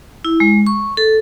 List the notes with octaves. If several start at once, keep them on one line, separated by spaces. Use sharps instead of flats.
E4
G#3
C#6
A4